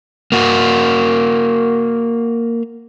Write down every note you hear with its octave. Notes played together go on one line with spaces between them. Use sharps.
A#3 F#4